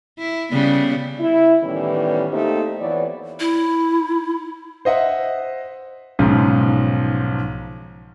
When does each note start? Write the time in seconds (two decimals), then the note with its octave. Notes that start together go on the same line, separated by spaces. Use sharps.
0.18 E4
0.52 C#3 G3 B3
1.20 E4
1.62 A2 D#3 E3 G3 B3 C#4
2.31 A3 A#3 C4 D#4 G4
2.80 F2 E3 B3 B4 C#5 D5
3.40 E4
4.85 C5 D#5 E5 F#5
6.19 B1 G#2 C#3 F3